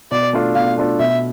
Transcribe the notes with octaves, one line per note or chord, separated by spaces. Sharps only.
B2 D5
A3 D4 F4 A4
B2 F5
A3 D4 F4 A4
B2 E5